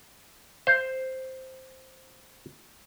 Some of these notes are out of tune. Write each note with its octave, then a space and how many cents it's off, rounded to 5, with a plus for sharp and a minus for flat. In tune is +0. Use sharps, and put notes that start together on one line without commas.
C5 +0 F5 -40